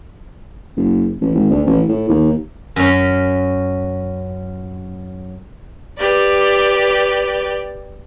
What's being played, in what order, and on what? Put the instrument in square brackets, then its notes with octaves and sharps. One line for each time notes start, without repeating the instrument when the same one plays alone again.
[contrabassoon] F#1
A1
G#1
D2
A1
A2
D#2
[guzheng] F#2 C#4
[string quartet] G4 B4 D5